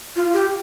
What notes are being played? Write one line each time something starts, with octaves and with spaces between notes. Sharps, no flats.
F4
G4